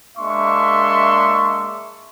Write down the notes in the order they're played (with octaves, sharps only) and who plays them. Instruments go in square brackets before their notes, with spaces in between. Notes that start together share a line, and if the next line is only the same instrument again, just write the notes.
[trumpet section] G#3 A#3 D4 E5 C6 C#6